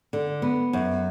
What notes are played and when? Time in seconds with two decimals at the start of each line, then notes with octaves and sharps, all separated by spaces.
0.13 D3
0.42 B3
0.73 F#2